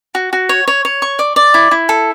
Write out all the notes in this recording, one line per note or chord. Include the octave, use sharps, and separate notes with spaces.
F#4
F#4
C#5
C#5
C#5
C#6
D5
D5
E4
E4
A4